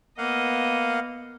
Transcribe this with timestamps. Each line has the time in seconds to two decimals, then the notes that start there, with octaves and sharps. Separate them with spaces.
0.18 A#3 B3 D#5 F5 F#5